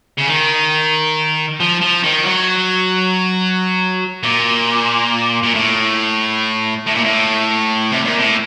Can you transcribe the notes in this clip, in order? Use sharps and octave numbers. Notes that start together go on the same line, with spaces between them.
C#3
D#3
F3
F3
D#3
F#3
A#2
A#2
A2
A2
A#2
A2
C3
A#2
A2